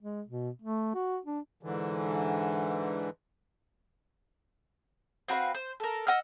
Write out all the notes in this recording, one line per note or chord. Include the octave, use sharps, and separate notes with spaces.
G#3
B2
A3
F#4
D4
G#2 D3 E3
C4 F#4 B4 F5
C5
A4 A#4
D#5 F#5 E6 F6